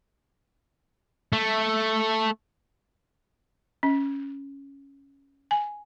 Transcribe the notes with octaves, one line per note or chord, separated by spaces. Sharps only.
A3
C#4
G#5